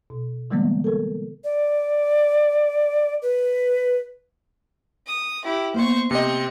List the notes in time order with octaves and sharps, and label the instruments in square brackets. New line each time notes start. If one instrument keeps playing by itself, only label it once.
[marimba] B2
D3 E3 G3 G#3 A#3 B3
A4 A#4
[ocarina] D5
B4
[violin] D#6
E4 G4
[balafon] A#3 B3 [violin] C5 C#6
[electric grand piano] C3 D#5 [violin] C4 C#7